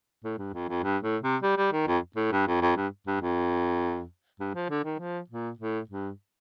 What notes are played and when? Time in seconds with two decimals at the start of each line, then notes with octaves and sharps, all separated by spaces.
0.24 A2
0.38 G2
0.54 F2
0.69 F2
0.83 G2
1.03 A2
1.22 C3
1.43 G3
1.58 G3
1.73 D#3
1.87 F2
2.17 A2
2.32 G2
2.47 F2
2.62 F2
2.77 G2
3.07 G2
3.21 F2
4.40 G2
4.55 F3
4.70 D3
4.84 D#3
4.99 F3
5.30 A#2
5.59 A2
5.90 G2